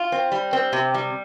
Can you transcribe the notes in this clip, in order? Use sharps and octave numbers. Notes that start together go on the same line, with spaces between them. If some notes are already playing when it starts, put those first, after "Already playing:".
Already playing: F4
C4
G3
C4
C3
G3